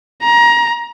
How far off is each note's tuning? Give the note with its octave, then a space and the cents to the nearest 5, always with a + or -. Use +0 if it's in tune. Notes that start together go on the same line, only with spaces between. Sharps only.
A#5 +25